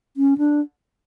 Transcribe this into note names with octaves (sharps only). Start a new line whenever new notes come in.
C#4
D4